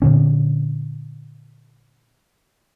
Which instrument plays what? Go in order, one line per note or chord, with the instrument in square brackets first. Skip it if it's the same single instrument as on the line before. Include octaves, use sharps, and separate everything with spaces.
[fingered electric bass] A#2 D3 C#4